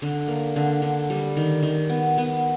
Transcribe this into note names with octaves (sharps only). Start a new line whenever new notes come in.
D3
A#3
D3
D3
G3
D#3
D#3
B3
B3